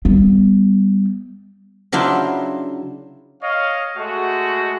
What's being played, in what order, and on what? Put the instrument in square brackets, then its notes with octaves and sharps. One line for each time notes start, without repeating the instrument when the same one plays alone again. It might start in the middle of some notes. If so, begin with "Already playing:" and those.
[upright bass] G3 B3
[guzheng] C#3 F#3 D4 E4 F4 C5
[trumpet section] C#5 D#5 F5
G#3 A3 F#4